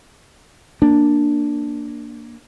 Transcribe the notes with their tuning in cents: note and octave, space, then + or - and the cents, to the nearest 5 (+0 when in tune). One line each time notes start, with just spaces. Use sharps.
A#3 +0 D4 +0